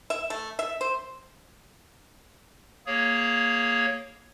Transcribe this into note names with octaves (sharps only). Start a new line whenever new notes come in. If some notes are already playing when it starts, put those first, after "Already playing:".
E5
A3
E5
C5
A#3 G#4 C#5